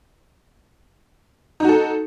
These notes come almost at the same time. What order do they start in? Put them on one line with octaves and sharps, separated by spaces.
D#4 F#4 A4